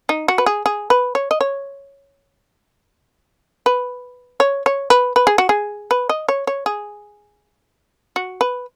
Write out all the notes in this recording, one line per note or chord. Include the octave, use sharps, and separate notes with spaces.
D#4
F#4
B4
G#4
G#4
B4
C#5
D#5
C#5
B4
C#5
C#5
B4
B4
G#4
F#4
G#4
B4
D#5
C#5
C#5
G#4
F#4
B4